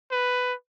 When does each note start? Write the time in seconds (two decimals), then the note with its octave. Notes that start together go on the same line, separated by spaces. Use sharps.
0.11 B4